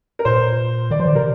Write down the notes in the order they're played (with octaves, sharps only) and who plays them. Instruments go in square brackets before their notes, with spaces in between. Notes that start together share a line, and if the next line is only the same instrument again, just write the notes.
[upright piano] A#4
[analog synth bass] A#2 [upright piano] C5
[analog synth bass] D#3 [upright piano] D5
[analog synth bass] F3 [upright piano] C5
[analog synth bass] D#3 [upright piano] D5
[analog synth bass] C3 [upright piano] A#4